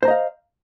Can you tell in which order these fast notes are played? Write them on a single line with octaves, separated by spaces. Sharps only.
C5 A#5 D#5 F5